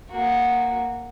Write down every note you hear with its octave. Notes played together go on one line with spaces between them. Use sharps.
A#3 F#4